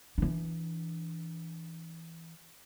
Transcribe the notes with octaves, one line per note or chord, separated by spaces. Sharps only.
E3 D4